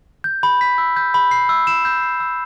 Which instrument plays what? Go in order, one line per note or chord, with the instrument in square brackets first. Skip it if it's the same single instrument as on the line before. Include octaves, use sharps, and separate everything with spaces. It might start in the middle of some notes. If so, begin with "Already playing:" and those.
[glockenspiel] G6
B5
B6
E6
G6
B5
C7
E6
E7
G6
C7
E6